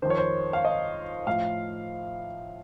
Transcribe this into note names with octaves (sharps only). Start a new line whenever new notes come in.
F2 D#3 C5
C#5
C5
F5
D#5
A2 F3 F5